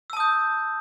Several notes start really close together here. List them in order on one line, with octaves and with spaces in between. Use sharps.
E6 A5 D#6 G6